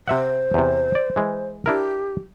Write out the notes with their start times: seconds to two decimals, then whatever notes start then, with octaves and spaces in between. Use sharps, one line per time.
0.08 C3 C5 E5 F#5
0.54 E2 C3
0.95 D5
1.16 E3 G#3
1.66 D4 E4 G4 A#4